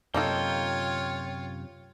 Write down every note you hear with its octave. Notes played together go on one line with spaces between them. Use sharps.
F#2 C3 A#3 D#4 F4 A4 C#5 G5